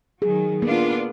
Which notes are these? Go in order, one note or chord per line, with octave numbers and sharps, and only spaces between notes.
D#3 F#3 G#4
A#3 B3 D4 F4